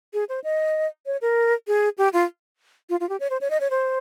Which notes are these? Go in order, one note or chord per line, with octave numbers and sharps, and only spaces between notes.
G#4
C5
D#5
C#5
A#4
G#4
G4
F4
F4
F4
G4
C#5
C5
C#5
D#5
C#5
C5